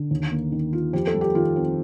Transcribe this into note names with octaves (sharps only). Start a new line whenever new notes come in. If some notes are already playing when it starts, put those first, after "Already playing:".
Already playing: D3
D#2
A#3
D#3
F4
F2 G4
A4
G3
G4
D#3 F4
C4